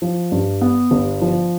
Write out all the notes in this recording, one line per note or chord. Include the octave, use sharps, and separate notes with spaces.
F3
G2
B3
G1
F3